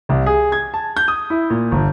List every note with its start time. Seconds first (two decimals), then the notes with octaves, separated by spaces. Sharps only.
0.09 C2
0.26 G#4
0.52 G#6
0.74 A5
0.97 G6
1.08 D#6
1.30 E4
1.50 A#2
1.71 G1